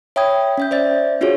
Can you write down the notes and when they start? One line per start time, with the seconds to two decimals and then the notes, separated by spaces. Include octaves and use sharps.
0.16 C#5 E5 G5 B5 D#6 G#6
0.58 C#4 E5 G6
0.71 C5 D5 E5 A6
1.21 D4 F4 F#4 G#4 C#5